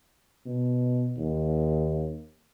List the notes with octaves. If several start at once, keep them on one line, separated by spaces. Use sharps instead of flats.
B2
D#2